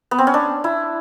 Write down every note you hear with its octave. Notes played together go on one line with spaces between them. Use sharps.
B3
C4
C#4
D4
E4